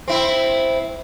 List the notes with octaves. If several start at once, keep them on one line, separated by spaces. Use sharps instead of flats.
C4 E4